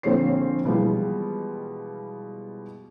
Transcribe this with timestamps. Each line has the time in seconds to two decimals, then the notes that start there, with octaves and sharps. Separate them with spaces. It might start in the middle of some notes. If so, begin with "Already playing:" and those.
0.03 A#1 D3 C4 C5 C#5 C7
0.65 B2 E3 F3 G3 G#3